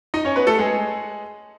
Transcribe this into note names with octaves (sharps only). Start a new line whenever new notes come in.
D#4 D#5
C#4 C#5
B3 B4
A3 A4
G#3 G#4